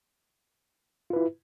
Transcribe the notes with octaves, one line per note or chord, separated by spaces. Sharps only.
E4 F4 B4